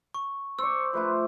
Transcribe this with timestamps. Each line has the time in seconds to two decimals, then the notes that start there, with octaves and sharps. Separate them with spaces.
0.14 C#6
0.59 C5 D5 C#6 E6
0.93 F3 A3 F4 B4